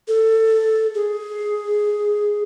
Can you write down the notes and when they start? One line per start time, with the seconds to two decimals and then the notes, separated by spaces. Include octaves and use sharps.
0.08 A4
0.95 G#4